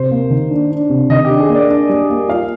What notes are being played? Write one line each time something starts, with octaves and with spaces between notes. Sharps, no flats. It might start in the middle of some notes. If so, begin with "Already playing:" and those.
Already playing: C3 C5
A#3
D#3
D4
D4
C3
D#3 D#5
D4 G4
G#4
A#3
D5
D4
G3
A#3
F4 F5